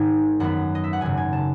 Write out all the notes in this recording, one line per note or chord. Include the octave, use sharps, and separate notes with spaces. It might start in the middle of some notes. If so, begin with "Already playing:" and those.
Already playing: G#1 G#2 D#3 G#3 G#5
F#2 D#3 F#3 B3 F#5
D#5
E5
F#5
G#1 F#2 C#3 G#5
G#5
A5